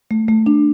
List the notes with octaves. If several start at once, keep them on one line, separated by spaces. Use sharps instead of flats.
A3
A3
D4